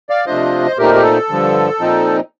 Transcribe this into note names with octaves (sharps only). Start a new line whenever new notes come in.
D5 F5
C3 F3 A3 D4 F4 C5 D#5
C5
A#2 A3 C4 D#4 G4 A#4
G4
A4
G2 D3 F3
A#2 F3 C4 D#4